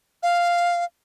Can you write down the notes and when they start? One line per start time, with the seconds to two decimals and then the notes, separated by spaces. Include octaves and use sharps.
0.23 F5